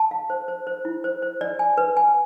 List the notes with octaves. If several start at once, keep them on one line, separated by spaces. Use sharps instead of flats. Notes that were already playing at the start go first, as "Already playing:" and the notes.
Already playing: A5
F5
C5
C5
C5
E4
C5
C5
D5
G#5
B4
G#5